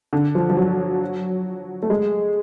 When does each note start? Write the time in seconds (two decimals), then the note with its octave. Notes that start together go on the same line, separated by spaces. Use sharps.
0.13 D3
0.35 F3
0.50 F3
0.57 F#3
1.83 A3
1.90 G#3